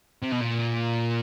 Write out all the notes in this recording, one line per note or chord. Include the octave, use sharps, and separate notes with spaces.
C3
B2
A#2